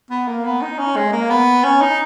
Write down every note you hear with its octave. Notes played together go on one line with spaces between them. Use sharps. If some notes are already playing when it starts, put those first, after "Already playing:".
B3
A#3
B3
D#4
C#4
G#3
A#3
B3
C#4
D#4